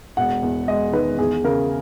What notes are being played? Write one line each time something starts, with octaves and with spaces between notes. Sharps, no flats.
E1 F#5
E2
G#3 D#5
D#3 B4
E2 G#4
C#3 A#4